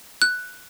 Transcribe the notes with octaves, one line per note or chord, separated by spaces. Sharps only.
F#6